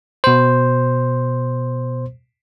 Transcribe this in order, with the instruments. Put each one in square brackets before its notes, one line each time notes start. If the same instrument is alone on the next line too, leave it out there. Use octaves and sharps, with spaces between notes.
[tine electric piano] B2 C5